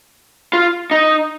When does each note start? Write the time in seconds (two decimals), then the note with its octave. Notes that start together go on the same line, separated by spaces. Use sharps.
0.53 F4
0.91 D#4